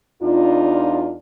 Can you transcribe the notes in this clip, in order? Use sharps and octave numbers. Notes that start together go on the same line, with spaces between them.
E2 D4 D#4 F4